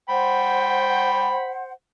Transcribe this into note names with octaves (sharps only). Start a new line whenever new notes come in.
C5 F#5 G5 B5